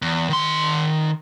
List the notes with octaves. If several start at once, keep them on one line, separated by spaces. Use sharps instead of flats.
E2
D#3 C6